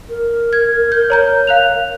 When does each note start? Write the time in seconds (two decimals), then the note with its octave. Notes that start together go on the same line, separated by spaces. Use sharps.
0.09 A#4
0.53 G#6
0.92 G6
1.10 C#5 A#5 G6
1.47 F5 F#6 F7